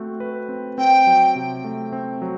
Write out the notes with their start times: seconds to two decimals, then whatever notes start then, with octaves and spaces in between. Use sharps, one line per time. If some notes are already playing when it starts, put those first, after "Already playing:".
Already playing: A3 C4 F#4
0.20 B4
0.49 C4
0.78 C4 G5
1.07 F#3
1.35 C3
1.64 A3
1.93 C4
2.22 F#3